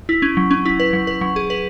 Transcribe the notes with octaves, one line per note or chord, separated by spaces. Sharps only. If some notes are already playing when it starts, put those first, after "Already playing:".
E4
C#4
F#3
C#4
E4
B4
F#3
B4
F#3
G#4
B4